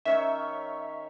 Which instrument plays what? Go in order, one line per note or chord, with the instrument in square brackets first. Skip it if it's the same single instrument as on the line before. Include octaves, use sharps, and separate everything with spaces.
[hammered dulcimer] D#3 C#4 C#5 [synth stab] E5